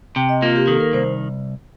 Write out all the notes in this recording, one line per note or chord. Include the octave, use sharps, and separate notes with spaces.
C3 G5
D#5
A#3 F4
G4
D#3 A4
A#4
C2 C5